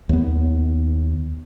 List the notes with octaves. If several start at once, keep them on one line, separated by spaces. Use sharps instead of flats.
D#2 B3